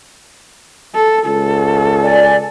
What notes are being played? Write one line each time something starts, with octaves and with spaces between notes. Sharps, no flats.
A4
C#2 A4
D5 G#5